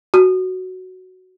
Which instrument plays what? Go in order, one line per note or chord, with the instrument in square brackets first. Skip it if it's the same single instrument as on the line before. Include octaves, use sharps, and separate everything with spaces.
[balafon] F#4